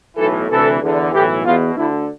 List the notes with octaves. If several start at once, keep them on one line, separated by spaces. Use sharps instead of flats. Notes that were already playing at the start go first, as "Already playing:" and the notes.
B1 A2 E3 A4
D2 C3 E3 A4
E2 D3
B1 A2 E3 G4
E2 B2 F4
D2 D3 E4